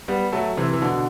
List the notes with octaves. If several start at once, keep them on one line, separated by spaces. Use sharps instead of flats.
G3 B3
F#3 A3
C3 E3
E3
B2 D3